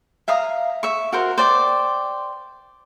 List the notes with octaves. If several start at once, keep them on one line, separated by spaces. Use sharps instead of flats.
E5 F5 A#5 D#6
E5 C#6
F#4 A#4 C5
C5 D5 G5